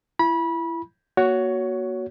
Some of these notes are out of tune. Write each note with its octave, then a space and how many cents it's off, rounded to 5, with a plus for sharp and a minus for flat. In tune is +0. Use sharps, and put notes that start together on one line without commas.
E4 +25 B5 -25
A#3 +30 F#4 +0 C#5 +15